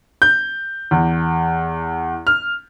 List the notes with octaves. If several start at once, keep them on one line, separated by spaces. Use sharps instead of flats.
G6
E2
F6